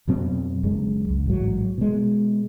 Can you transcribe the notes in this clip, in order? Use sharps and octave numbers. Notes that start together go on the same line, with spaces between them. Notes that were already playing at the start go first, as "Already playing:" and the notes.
F2 B2 F#3 C4
F#1 F#2 F#3 G#3
C#2
A1 G#2 F#3
B2 G#3